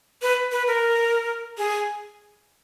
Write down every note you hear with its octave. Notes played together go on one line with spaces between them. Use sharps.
B4
B4
A#4
G#4